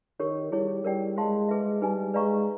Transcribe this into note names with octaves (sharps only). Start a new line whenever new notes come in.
D#3 G4 A#4 C#5
G3 E4 G#4 C#5
G3 A#4 D5 G5
G#3 C5 F5 A5 C6
G#4 B4 E5
G3 D#4 G#4 B4 D#5 G#5
G#3 B4 D5 F5 A#5 C#6